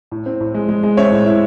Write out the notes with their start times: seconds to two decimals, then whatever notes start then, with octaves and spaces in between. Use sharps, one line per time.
0.11 A2
0.26 C4
0.40 A2
0.54 G#3
0.69 G#3
0.83 G#3
0.97 C4 C#5 E5
1.11 A2
1.26 E4